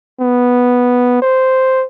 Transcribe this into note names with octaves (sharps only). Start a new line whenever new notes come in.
B3
C5